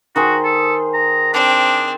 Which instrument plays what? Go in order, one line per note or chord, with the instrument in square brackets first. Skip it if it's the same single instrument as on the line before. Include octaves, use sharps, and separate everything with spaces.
[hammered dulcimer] D#3 G#4 C5 [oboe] F#4
[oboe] A4
A#5
[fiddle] C4 [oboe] D4